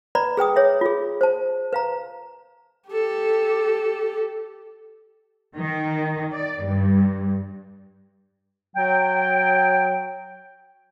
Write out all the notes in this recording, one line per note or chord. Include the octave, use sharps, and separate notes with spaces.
B4 D5 A#5 B5
G#4 B4 G5 D#6
G#4 C#5 E5
F4 G#4
C5 A5
B4 F5 A#5
G4 A4
D#3
D5
G2
F#3 G5